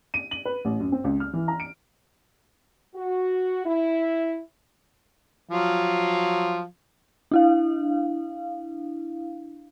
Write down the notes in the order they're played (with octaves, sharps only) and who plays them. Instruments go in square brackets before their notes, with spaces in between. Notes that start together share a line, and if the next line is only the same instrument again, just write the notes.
[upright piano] D#7
F#7
B4
A1
F#2
C4
C#2
F6
E3
A#5
D7
[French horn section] F#4
E4
[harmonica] F3 F#3 F4
[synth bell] D4 E4 F5